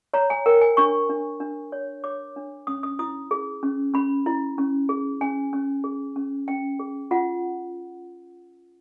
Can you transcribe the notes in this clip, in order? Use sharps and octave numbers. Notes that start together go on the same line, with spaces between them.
C#5 A#5
G#5
A#4 G5
G#5
D4 C#6
D4
D4
C#5
C#5 D6
D4
C#4 D#6
D#6
E4 D#6
G#4
C#4
C#4 B5
E4
C#4
G#4
C#4 G#5
C#4
G#4
C#4
C#4 G5
G#4
F4 F#5